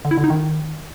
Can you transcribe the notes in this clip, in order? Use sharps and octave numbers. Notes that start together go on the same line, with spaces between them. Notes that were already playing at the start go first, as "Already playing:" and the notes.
D3
E4
D3
D#4
D#3